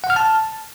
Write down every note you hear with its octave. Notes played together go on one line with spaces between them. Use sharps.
F#5
F6
A5